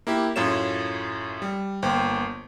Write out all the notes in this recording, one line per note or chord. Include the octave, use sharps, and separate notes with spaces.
A#3 E4 G4
F#2 A2 F4 C#5 E7
G3
G1 A#3 C5 G5